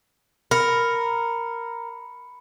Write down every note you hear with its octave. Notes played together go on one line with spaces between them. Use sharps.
A#4 B5 C#7